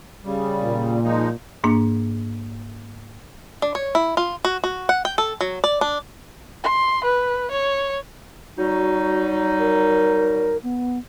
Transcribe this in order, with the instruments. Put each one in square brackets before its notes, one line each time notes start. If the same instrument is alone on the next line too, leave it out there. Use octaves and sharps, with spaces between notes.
[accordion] C#3 G3
[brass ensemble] A#2
[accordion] F3 G#3 D#4
[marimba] G#2 A#3 D4
[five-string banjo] D4
C#5
E4
F4
F#4
F#4
F#5
G5
A4
F#3
D5
D4
[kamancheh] C6
B4
C#5
[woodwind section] F#3 G3 D#4 [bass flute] F#4
[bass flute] A#4
B3